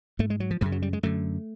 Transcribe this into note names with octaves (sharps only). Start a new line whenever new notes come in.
G#2 A3
G#3
F#3
F3
F#2 C#3 F3
F#3
G3
G#3
F#2 D3 A3